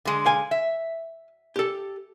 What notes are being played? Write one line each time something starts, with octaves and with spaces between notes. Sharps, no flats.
D3 G#3
F5 G#5
E5
G4 A4